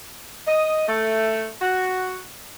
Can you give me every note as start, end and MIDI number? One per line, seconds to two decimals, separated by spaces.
0.46 0.87 75
0.88 1.50 57
1.61 2.23 66